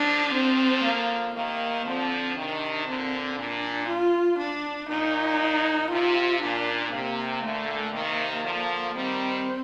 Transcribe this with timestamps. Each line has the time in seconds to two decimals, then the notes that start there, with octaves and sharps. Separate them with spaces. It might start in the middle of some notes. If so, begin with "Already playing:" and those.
Already playing: D3 F3 D4
0.34 C4
0.84 A#3
1.35 C3 D#3 A#3
1.86 D3 F3 C4
2.36 C3 D#3 D4
2.87 A#2 D3 C4
3.38 A#2 D4
3.89 F4
4.38 D4
4.89 A#2 D#4
5.91 C3 F4
6.41 A#2 D4
6.92 C3 A#3
7.43 A#2 D3 A3
7.93 C3 D#3 A#3
8.44 D3 F3
8.95 D#3 G3 C4